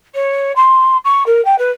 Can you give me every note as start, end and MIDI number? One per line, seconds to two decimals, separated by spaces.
0.14 0.52 73
0.56 0.97 84
1.04 1.24 85
1.26 1.43 70
1.45 1.57 79
1.58 1.71 71